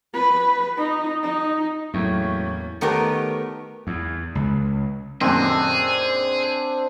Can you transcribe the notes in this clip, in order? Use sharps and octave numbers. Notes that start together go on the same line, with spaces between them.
B4
D#4
D#4
E2 A2 F#3 A3 A#3 C#4
D#3 A3 B3 G4 A#4 C#5
E2
C#2
F#2 A#2 D#3 C4 D4 G#4